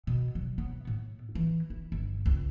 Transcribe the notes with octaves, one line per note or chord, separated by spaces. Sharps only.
B2
F#3
B3
A2
E3
E4
G1
C#2